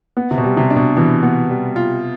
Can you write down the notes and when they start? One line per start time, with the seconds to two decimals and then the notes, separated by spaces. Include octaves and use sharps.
0.17 B3
0.31 C3
0.38 B2
0.44 G3
0.57 C3
0.70 D4
0.76 B2
0.97 B2 E3
1.23 B3
1.49 G3
1.76 F4